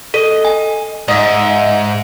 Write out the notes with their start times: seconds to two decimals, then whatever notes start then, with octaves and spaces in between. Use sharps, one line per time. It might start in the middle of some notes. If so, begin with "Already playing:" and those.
0.14 A4 D#5
0.45 G#5
1.08 G#2 D#5 E5